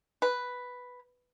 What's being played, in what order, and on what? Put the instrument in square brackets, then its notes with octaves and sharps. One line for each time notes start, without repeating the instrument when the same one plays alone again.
[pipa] B4